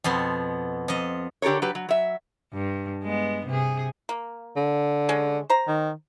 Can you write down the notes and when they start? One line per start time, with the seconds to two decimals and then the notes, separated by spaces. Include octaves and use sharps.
0.04 F2 B2 B3 C6
0.88 F2 D#5
1.42 D3 G4 A4 A#4 C#5
1.62 F#3 G4 B4
1.75 F#3
1.89 F#3 E5
2.53 G2
3.03 G#3 B3
3.46 C3 G#4
4.09 A#3
4.56 D3
5.09 G#3 C#4
5.50 C5 A#5
5.68 D#3